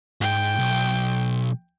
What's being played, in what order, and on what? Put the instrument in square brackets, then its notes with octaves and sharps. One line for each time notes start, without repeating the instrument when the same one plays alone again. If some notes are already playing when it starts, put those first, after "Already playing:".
[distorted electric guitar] G#2 [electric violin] G5
[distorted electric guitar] B1